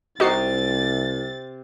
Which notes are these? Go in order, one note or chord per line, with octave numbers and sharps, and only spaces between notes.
C2 C3 D#4 F#4 A6 C7